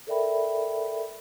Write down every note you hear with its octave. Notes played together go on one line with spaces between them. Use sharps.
A4 A#4 D5 E5 G5 B5